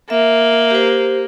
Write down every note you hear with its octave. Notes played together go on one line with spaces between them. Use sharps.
A#3 E5
G4 C5